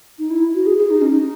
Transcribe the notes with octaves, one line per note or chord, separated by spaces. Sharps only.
D#4
E4
F#4
G#4
G#4
D#4
C#4
D#4